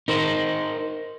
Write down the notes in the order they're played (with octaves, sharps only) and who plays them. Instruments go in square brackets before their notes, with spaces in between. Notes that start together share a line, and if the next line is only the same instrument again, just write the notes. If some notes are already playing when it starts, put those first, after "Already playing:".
[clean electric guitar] D#4 A#4 C5